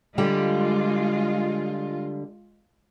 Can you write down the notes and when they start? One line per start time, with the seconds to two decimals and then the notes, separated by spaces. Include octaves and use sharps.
0.18 D3 G3 G#3 F4 G4